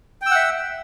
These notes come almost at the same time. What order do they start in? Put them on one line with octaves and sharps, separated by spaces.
G5 E6 F#5 E5